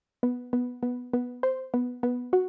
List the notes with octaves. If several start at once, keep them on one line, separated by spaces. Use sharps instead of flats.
B3
B3
B3
B3
C5
B3
B3
F#4